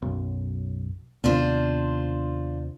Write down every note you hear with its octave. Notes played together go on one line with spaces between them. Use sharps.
B1 F#2
D#2 C3 B3 D4 F4 C5